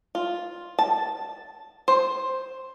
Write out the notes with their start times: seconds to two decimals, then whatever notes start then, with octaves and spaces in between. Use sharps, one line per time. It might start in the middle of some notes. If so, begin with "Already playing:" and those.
0.15 F4
0.79 A5
1.88 C5